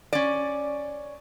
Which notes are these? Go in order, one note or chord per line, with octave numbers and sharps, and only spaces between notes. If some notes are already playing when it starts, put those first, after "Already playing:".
C#4 D5